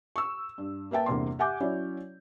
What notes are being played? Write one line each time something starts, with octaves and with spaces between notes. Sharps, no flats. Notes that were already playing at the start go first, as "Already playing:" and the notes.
C#6 E6
G2
A#3 B4 E5 G5 A5
E2 G2 C3 A#3 C6
G4 E5 F#5 G#5 D6 G6
F#3 C#4 E4 C#5 D5